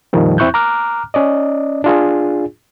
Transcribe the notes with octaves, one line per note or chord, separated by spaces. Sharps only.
F2 A#2 D#3 F3 G3
E2 C4 E4 C#6 F#6 G6
A#5 D6 F6 F#6
C#4 D5 D#5
D4 F4 G#4